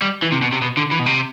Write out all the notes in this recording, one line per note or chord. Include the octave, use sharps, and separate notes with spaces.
G3
E3
C3
B2
C3
B2
D3
E3
B2
C3